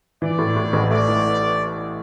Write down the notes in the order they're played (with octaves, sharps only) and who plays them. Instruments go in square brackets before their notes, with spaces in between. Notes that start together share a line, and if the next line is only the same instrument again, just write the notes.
[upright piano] E3 [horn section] D5
[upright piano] A2
A2
A1
[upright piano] A3 [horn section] D5
[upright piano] E3